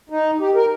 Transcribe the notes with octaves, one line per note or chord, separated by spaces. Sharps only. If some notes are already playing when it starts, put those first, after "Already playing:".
D#4
G4
A#4